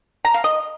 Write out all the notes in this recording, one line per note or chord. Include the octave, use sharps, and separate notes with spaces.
A#5
F5
D#5